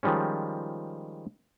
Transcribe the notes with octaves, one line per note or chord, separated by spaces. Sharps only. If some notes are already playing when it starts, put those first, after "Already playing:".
D#3 F3 G3 G#3 C#4